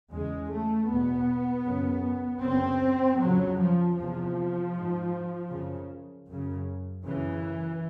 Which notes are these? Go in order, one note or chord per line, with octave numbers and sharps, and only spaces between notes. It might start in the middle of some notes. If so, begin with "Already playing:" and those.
E2 C#3 G#3
A3
E2 B2 B3
F#2 C#3
F#2 C#3 C4
F2 C#3 F#3
F3
E2 C3 F3
G#2
F#2 C#3
F#2 C#3
F#2 C#3 E3